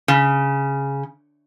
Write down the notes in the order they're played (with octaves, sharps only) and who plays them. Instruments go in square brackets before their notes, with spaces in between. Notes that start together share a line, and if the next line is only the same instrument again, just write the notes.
[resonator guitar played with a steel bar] C#3